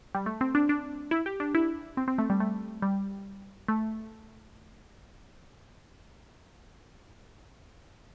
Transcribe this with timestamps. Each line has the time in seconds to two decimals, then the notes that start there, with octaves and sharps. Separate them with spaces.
0.15 G3
0.26 A3
0.41 C4
0.55 D4
0.69 D4
1.11 E4
1.26 G4
1.40 D4
1.55 E4
1.97 C4
2.08 C4
2.18 A3
2.30 G3
2.40 A3
2.82 G3
3.68 A3